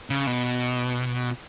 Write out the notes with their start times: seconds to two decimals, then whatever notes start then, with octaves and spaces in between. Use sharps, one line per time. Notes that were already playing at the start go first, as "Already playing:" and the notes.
0.10 C#3
0.27 B2